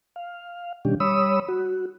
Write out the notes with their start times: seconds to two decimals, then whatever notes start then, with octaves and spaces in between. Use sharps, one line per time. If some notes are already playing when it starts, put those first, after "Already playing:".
0.16 F5
0.85 B2 D#3 G3 C#4 D4 G4
1.00 G3 C#5 B5 D#6 E6
1.48 F#4